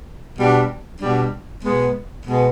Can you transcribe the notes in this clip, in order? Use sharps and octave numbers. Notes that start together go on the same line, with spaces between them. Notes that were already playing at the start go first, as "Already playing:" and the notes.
B2 G3 D4
B2 G3 D4
B2 G#3 B3
B2 G#3 B3